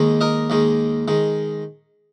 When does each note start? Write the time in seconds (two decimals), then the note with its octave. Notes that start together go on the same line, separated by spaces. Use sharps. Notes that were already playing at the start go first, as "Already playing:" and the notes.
Already playing: D#2 D#3 G#3
0.21 A#4 D#5
0.50 D#2 D#3 G#3
1.08 D#3 G#3